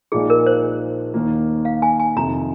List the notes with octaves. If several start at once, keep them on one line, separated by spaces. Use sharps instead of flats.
A#1 A#2 G#3 D#4 G#4
A#4
C5
D#2 D#3 A#3
F5
G#5
G#5
F2 C3 D#3 A#5